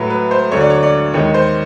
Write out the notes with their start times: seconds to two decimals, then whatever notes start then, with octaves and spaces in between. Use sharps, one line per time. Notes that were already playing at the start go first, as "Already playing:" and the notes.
Already playing: A2 F#3 B4
0.10 B4
0.31 C5
0.52 D2 D3 F#3 C#5
0.61 D5
0.70 C#5
0.83 D5
1.13 D#2 D#3 G#3 C#5
1.34 C5